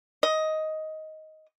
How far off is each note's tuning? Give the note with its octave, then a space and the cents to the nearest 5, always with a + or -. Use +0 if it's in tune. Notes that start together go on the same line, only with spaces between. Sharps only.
D#5 +10